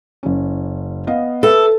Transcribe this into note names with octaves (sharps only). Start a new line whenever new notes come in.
F#1 C#4
B3 D#5 F5
A4 B4 E5